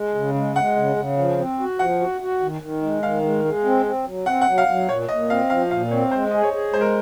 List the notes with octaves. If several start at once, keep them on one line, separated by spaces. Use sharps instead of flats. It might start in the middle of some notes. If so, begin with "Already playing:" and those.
Already playing: G#3
C#3
G#3
G#3 F#5
C#3
C#3
F3
C4
F#4
F3 F#5
F#4
F#4
D#3
D#3
G#3
D#3 F5
G#3
G#3
C4
C4
F#3
C4 F#5
F#5
F#3
F5
F#3
A#2 C#5
A#2 D#5
C4 F5
F3 F5
A#2 F5
C4 C#5
G#3 C5
G#4 D#5
C#5
G#4
G#3 C5
A#4